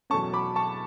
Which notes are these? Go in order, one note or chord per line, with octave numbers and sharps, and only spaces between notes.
E2 B2 F#3 A3 C#4 A5 C#6
B5 D6
A5 C#6